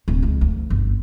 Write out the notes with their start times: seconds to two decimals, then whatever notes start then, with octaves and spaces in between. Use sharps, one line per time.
0.08 D1
0.23 C#2
0.41 D2
0.70 G1